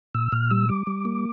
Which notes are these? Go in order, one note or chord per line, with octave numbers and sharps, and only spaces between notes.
A#2 E6
A#2 F6
G3 E6
G3 D6
G3
A#3